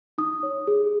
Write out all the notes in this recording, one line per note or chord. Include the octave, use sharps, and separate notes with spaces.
D#4 D#6
C#5
G#4